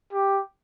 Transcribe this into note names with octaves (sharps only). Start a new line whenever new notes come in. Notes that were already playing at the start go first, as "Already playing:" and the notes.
G4